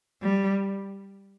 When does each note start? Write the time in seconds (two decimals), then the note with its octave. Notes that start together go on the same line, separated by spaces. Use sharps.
0.22 G3